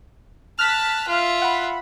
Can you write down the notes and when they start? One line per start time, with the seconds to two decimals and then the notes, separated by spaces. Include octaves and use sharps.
0.59 A5 F6 F#6 B6
1.08 F4 E5
1.42 F#5 B5